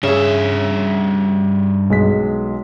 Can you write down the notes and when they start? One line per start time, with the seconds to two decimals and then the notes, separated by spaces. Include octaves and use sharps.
0.03 G2 C#3 G#4 E5
1.90 B1 G#3 B6